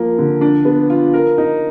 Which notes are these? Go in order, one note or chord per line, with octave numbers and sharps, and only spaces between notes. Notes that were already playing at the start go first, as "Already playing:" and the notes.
Already playing: F3 A#3
D3
D4
B3
F4
A#4
D#4